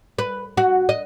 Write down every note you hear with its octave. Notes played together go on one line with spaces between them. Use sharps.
B4
F#4
D#5